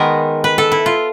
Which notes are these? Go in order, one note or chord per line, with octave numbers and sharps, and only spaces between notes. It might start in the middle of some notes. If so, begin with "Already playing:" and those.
Already playing: D#3 G#3 B3 A#4
B4
A4
E4
F4